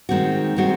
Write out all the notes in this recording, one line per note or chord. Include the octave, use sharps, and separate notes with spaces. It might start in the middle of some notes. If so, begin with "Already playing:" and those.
D#3 G#3 C4 F#4
D#3 G#3 C4 F#4